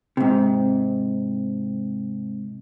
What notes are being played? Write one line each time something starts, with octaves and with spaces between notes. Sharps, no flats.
G#2 C3